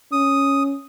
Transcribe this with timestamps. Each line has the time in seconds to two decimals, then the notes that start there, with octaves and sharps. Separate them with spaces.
0.12 C#4 D#6